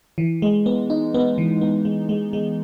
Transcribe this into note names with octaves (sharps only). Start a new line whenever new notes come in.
E3
G#3
B3
D#4
B3
E3
B3
G#3
G#3
G#3